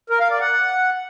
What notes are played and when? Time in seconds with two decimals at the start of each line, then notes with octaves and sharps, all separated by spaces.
0.10 A#4
0.20 F5
0.30 D5
0.40 F#5